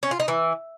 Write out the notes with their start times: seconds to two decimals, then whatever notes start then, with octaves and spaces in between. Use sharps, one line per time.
0.03 C#4
0.11 F4
0.20 D#4
0.28 E3